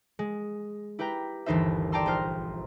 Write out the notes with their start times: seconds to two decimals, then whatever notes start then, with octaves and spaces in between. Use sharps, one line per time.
0.19 G#3
0.99 E4 G4 B4 G5 A#5
1.46 G1 D#2 E3 D#4 C5 E5
1.92 D5 G5 A5 A#5 C6 E6
2.06 A#1 D#4 C5 F6